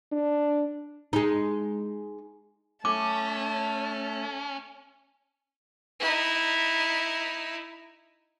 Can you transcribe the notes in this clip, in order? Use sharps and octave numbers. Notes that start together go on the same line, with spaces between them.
D4
G#3 D#4
A3 C#4 A5 D6
D#4 E4